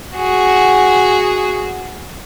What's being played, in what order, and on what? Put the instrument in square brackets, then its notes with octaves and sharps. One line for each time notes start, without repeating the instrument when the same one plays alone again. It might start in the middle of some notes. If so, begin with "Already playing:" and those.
[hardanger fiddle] F#4 G#4